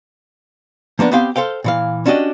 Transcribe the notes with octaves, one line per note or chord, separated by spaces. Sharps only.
F3 A#3 B3 D4
B3 C4 G4 F5 G5
A4 C5 F5 G5
A#2 E3 F5
C#4 D4 F#4 G4 D#5